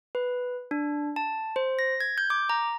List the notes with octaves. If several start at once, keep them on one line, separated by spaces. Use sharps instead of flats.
B4
D4
A5
C5
A#6
G#6
G6
D6
A#5